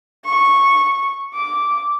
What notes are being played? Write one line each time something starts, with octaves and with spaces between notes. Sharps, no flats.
C#6
D6